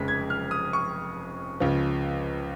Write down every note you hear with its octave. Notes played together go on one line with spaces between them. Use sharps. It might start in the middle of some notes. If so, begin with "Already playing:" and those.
Already playing: F1 F2 C#3 G#3 B6
G#6
F6
D#6
C#6
C#2 C#3 F3